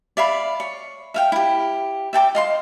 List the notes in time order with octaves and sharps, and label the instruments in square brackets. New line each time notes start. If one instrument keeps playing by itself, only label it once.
[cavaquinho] D5 E5 F5 B5
C#5
E5 F5 G5
E4 G4
E5 G5 A5 D6
D#5 F5 C6